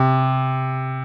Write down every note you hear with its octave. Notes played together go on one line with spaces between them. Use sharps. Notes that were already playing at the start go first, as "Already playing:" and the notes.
Already playing: C3